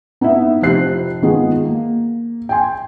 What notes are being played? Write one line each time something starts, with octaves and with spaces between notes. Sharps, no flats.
B3 D#4 E4 E5
F1 F3 F4 G4 F#6 C7
D#3 G#3 B3 F4 G#4
A#3
G5 G#5 C6